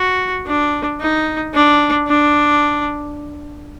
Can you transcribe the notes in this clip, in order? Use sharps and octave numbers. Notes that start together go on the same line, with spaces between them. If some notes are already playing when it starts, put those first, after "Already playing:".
Already playing: F#4
D4
D#4
D4
D4